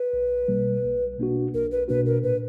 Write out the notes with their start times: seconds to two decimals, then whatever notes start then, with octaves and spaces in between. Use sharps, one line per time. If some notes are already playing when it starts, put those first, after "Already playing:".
Already playing: B4
0.13 B1
0.48 B2 G3 A#3
0.84 B1
1.18 B2 A#3 D4 F#4
1.54 B1 A#4
1.71 B4
1.88 B2 A#3 D4 F#4 B4
2.06 A#4
2.24 A#2 B4